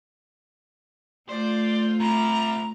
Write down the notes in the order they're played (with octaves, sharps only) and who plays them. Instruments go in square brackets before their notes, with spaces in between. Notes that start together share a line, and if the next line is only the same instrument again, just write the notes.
[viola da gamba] A3 F4 [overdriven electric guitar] C5 [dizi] D5
[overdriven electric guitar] C3 E4 [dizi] A#5